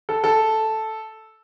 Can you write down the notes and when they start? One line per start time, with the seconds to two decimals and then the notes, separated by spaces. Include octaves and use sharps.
0.09 A4
0.24 A4